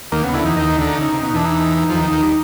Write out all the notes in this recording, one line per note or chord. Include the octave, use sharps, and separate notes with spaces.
D#2 D#3 A#3
C#3 B3
D2 D3 E4
E2 E3 D#4
D#2 D#3 D#4
D2 D3
C#3
C3
B2
E2 E3 D4
D#4
F2 F3
E3
D#2 D#3
D#2 D#3
G3